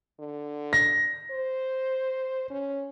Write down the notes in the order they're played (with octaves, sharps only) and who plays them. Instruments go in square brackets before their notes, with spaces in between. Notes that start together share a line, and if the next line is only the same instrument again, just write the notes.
[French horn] D3
[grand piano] A#6
[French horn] C5
C#4